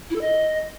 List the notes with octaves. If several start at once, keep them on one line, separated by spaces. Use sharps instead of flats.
E4
A4
D#5